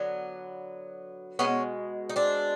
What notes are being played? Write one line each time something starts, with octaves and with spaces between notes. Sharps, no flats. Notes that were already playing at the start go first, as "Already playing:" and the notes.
Already playing: D3 F#3 B3
B2 G#3 B3 C#4
D#4
C4 D4